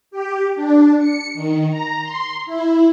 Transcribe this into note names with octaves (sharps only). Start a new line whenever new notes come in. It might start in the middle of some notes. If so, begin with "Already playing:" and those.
G4
D4
C#7
D#3
A#5
C6
E4